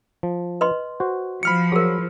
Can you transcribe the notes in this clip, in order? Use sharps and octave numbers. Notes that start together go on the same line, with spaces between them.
F3
B4 D#5 C6
F#4 C5
F3 B5 F6 C#7
F#3 G#4 A#4